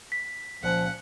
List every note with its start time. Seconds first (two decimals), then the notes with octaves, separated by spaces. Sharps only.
0.12 B6
0.62 C#2 A#2 C#3 F3 F#5